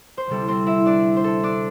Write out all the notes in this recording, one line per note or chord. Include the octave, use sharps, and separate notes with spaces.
C5
D2 C3 G3 C4 E4 A4
C4 C5
E4 E5
D4 D5
C5
A4
D4 D5